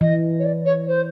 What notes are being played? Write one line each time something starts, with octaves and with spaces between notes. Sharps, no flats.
E3 D#5
C#5
D5
C#5
C5